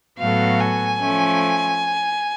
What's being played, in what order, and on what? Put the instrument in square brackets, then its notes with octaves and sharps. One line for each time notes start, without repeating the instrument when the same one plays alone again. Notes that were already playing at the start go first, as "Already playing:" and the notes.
[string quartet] A2 F#3 B3 F#4 A4 [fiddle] F5
[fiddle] G#5
[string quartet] F3 A3 C#4